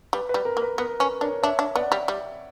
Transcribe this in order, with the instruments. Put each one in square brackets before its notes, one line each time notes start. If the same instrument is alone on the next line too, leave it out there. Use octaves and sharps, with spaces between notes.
[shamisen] G3 [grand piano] B4
[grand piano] B4
[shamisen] G3
[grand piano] A#4
[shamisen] A#3
[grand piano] B4
[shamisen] B3 [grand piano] A#4
[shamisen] C#4 [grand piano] B4
[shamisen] D4 [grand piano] A#4 C#5
[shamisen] D4 [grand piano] C#5 E5
[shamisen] D4
[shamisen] B3 [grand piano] D5 F#5
[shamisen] G3
G3